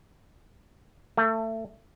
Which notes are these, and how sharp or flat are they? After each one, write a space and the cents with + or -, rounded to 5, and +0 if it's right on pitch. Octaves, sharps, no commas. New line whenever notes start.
A3 +25